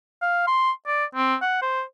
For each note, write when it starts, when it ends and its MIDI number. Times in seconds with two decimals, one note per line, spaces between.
0.22 0.45 77
0.47 0.71 84
0.87 1.05 74
1.15 1.35 60
1.41 1.61 78
1.62 1.83 72